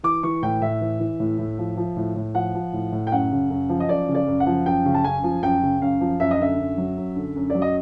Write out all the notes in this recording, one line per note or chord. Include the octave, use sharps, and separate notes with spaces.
E3 D6
E3 C#6
A2 G5
A2 E5
E3
E3
A2
A2
F3
F3
A2
A2
F3 F#5
F3
A2
A2
G5
F#2 F#5
C#3
F#2
F3
D#5
F#2 D5
C#3
D5
F#2
F#5
F3
F#2 G5
C#3
A5
F#2 G#5
F3
F#2 G5
C#3
F#2 F5
F3
F#2 E5
D#5
D3 E5
F#2
F#3
F#2
D3
F#2
F#3 D5
D#5